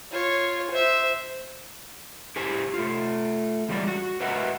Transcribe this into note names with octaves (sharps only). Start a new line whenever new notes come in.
F4 C#5
C5 E5
E4 G4 G#4 C5 G#5
A3 F4
E2 F3 G3 G#3 D5
F#4
F#4 A#4 B4 D#5 E5 F#5